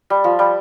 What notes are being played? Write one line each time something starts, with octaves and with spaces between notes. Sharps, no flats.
G3
F3
G3